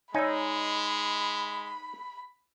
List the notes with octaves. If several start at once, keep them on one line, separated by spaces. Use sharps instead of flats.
G#3 D#4 C#5 D5 G#5 B5 E6